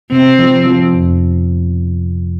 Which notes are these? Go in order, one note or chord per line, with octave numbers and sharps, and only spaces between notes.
C3 C4
F3
F3
F2